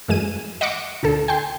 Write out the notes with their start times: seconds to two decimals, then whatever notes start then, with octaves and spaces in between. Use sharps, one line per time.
0.08 F#2 E3 G#3 G#5 D#7
0.61 D#5 F#5 B5 C#6 D6
1.03 D2 A2 D3 A4
1.28 G5 G#5 C6